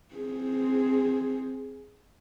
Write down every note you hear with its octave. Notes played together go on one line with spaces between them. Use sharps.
C4 G#4